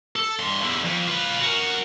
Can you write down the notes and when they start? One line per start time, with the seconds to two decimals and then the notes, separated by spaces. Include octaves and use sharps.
0.16 A4
0.39 G2 C6
0.61 E2 D3
0.84 F2
1.07 F4 B4
1.41 F#4 A#4